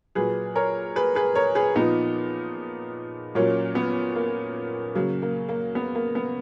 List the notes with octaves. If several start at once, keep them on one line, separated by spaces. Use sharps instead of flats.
A#2 F#3 G#4 B4
A#4 C#5
G#4 B4
G#4 B4
A#4 C#5
G#4 B4
A#2 F3 B3 D#4
A#2 F#3 A#3 C#4
B3
A#3
C#3 F#3 A#3
A#3
A#3
B3
A#3
B3